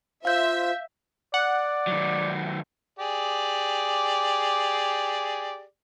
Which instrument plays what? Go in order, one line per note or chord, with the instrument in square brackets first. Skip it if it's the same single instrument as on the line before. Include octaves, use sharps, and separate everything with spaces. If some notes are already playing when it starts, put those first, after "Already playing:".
[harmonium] F4 C5 [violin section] E5 [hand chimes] F5 G6
[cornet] D5 [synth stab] F#5
[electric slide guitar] D#3 F#3
[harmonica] G4 G#4 D5